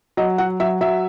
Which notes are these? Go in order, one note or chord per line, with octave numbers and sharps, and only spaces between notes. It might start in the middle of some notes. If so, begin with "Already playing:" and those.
F#3 D#5
F#3 F#5
F#3 E5
F#3 E5